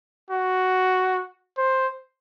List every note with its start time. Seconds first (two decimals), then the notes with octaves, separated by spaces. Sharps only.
0.30 F#4
1.58 C5